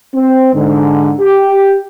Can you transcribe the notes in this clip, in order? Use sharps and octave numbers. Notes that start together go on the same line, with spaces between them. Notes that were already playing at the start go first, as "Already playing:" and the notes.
C4
G#2 D3
G4